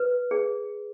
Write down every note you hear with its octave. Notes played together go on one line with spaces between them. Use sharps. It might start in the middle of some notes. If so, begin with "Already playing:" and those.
Already playing: B4
G#4